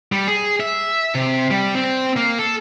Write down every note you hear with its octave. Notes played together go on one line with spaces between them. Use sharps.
G3
G#4
E5
C3
G3
C4
A#3
A4